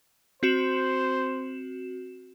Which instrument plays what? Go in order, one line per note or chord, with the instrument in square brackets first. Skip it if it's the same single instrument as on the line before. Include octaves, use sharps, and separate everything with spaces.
[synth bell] C4 F#4 E7 [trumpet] C5